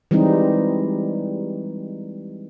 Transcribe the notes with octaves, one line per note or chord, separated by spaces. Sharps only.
E3 G3 G#3 C4 D#4